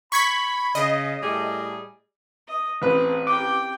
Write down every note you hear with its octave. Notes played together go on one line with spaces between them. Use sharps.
B5 C#6 G#6 B6
C#3 D#5
A2 G3 G#4
D#5
A1 C4 G#4 B4
G4 G5 D6